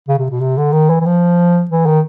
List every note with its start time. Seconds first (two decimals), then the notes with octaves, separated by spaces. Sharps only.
0.09 C#3
0.19 C3
0.30 B2
0.41 C3
0.57 D3
0.72 D#3
0.90 E3
1.01 E3
1.06 F3
1.71 E3
1.86 D#3